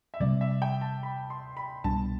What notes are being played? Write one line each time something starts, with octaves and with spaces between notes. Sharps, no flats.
E5
C3 G3 C4 D5
E5
G5
A5
B5
C6
B5
C2 B2 G3 D4 A5